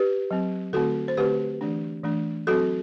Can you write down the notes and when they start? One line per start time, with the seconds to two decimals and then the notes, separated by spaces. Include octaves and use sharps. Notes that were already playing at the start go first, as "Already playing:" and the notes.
Already playing: G4 B4
0.31 F#3 C4
0.73 D3 A3 C4 F#4 A4
1.08 C5
1.17 D3 A3 C4 G4 B4
1.61 E3 A3 D4
2.04 E3 A3 D4
2.47 F#3 C4 F#4 A4